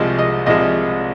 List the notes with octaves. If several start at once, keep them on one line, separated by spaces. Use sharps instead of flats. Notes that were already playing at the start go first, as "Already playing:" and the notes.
Already playing: C2 C3 F3 G#3 D#5
D#5
C2 C3 F3 G#3 D#5